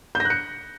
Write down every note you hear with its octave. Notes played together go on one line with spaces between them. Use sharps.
G6
A#6
F#6
C#7